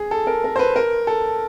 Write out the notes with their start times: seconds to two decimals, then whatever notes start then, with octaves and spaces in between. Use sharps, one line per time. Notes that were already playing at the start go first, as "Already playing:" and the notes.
Already playing: G#4
0.11 A4
0.27 A#4
0.44 A#4
0.56 C5
0.59 B4
0.76 A#4
1.07 A4